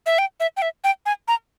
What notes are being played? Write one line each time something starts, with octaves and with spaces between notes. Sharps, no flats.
E5
G5
E5
G5
E5
G5
G#5
A#5